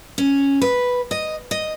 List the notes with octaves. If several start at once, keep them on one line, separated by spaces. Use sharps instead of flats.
C#4
B4
D#5
D#5